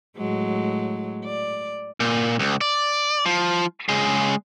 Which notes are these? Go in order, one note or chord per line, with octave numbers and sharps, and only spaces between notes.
A2 F#3 G#3
D5
A#2
C#2
D5
F3
C#3 G#3